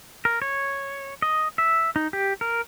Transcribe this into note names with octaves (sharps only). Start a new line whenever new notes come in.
A#4
C#5
D#5
E5
D#4
G4
A#4